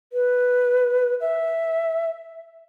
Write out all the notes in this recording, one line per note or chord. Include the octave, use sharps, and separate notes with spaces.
B4
E5